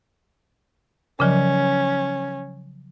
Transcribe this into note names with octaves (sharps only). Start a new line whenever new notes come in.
C#3 F3 F#3 C#4